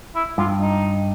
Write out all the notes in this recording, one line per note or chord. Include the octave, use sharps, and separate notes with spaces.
E4
G2 F4
D#4